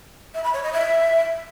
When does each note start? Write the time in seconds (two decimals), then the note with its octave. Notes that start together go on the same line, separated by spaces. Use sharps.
0.34 E5
0.44 B5
0.54 C#5
0.63 D#5
0.73 E5